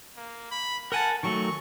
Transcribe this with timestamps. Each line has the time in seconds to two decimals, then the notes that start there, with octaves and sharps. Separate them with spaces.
0.17 A#3
0.51 B5
0.92 A#4 F#5 G#5 A5
1.23 D#3 F#3 A3 C#6